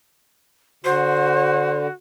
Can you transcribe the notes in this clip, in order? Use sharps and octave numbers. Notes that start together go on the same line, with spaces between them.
D3 F#4 C5